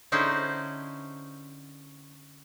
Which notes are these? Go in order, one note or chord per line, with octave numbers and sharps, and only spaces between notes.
D3 C#4 D#4 E4 G#4 C5